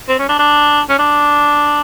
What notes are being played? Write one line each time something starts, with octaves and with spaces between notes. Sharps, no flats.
C4
C#4
D4
D4
C#4
D4